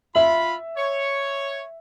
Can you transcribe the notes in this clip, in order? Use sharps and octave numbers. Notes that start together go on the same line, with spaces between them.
F4 E5 B5
C#5